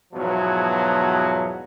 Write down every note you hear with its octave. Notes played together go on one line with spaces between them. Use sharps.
E2 G#2 B2 F3 F#3